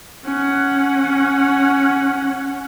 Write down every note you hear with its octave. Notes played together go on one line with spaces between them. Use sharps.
C#4 F#5